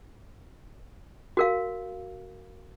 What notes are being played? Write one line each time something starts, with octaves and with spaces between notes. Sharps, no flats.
F#4 A#4 F5